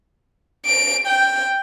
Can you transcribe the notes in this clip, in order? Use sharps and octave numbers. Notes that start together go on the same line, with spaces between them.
D7
G5